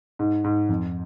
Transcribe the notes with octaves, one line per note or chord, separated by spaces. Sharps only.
G#2
G#2
F2